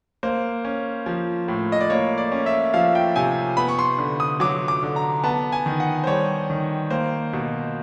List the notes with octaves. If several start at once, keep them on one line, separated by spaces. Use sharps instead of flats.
A#3 C5
C#4
F3
A2
D#5
D5
A#3 C#5
D5
C#4
E5
F3 F5
G5
C3 G#5
B3 B5
C#6
C6
D3
D#6
F#3 D6
D6
D3
A#5
B3 A5
G#5
D#3
F#5
C5
G3 C#5
D#3
A#3 C5
B2